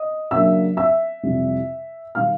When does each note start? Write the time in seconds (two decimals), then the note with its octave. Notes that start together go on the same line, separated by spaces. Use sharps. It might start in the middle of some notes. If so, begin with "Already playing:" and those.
Already playing: D#5 D#6
0.31 C#3 F#3 A#3 D4 E5 E6
0.77 E5 E6
1.23 F2 C3 E3 G3
2.15 D#3 G3 F5 F6